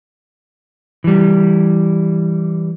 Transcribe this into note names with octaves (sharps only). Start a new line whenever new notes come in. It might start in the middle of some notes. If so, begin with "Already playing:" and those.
E3 G3